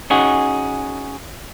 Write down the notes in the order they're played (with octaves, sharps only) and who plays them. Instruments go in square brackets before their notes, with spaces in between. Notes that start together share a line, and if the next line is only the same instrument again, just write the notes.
[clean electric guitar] C#4 D#4 F#4 G#4